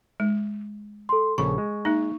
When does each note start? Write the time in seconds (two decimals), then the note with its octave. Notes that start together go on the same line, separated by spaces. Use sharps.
0.20 G#3
1.09 A4 C6
1.38 A#1 C#3 A4 B5 C#6
1.58 G#3
1.85 A#3 D#4